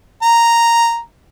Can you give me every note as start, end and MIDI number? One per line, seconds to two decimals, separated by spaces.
0.22 0.98 82